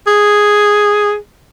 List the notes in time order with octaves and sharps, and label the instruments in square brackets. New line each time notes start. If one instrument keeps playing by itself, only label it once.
[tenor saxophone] G#4